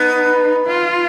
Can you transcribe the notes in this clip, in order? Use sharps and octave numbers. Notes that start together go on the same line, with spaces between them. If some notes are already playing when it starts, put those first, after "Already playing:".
Already playing: B3 D#4
F4